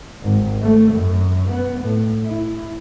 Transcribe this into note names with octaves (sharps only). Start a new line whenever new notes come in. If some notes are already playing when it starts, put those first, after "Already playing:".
G#1
A3
F#2
B3
A2
E4